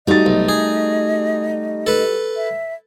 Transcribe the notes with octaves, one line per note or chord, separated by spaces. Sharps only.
G3 A3 D#4 F#4 D#5 A6
B1
G#4
A4 B4
E5